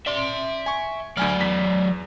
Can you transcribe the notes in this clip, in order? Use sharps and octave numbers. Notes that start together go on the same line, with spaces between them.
D5 E5 C6
G#5 C#6
D2 F#3 D5 G#5 F6
E2 B6